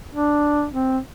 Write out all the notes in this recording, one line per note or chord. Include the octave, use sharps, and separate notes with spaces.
D4
C4